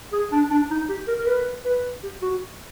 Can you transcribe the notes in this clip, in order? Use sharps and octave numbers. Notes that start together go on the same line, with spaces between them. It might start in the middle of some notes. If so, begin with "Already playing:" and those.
G#4
D4
D4
D#4
G4
A#4
A#4
B4
B4
G4
F#4